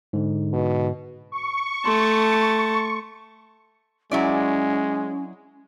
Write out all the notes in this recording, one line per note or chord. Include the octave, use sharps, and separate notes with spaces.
G#2 D3
B2
C#6
A3 A5 C6
F#3 G#3 C#4 E4 D5